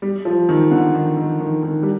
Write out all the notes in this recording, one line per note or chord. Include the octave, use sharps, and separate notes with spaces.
G3
F3
D#3
D3
D#3
D#3
D#3
D#3
G3